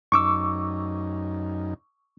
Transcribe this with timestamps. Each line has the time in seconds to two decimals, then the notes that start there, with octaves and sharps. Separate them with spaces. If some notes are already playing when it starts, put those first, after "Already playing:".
0.12 F#2 D#4 C#6 D6 E6